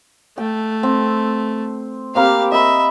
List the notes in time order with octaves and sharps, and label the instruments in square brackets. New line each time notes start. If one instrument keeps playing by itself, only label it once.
[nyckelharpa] A3 [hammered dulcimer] G5
[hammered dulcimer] C4
[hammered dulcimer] A#3 C4 B5 [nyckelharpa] G4 F5
[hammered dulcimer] D#5 B5 [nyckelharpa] E5